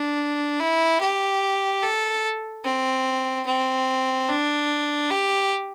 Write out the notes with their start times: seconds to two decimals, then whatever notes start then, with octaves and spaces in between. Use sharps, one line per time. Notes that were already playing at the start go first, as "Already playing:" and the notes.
Already playing: D4
0.60 E4
1.00 G4
1.83 A4
2.64 C4
3.46 C4
4.29 D4
5.10 G4